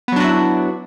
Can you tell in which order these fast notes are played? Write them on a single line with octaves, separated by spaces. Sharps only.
B3 F#3 D4 F#4 E4